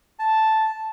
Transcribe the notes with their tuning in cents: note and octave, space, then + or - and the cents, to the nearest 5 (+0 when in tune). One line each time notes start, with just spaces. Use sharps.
A5 -5